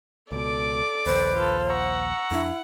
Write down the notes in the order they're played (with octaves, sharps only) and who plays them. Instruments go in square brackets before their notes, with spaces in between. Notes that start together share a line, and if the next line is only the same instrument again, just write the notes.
[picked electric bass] C#2 B2 [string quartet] A4 D5 D6
[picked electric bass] A#1 D#2 [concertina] B4 [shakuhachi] C5
[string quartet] F4 A4
[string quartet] F#5 [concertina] A#5 C#6 E6
[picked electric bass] F2 C#4 D4 [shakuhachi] E4